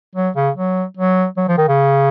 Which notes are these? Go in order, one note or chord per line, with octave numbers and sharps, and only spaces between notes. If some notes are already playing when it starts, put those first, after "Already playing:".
F#3
C#3
F#3
F#3
F#3
F3
D#3
C#3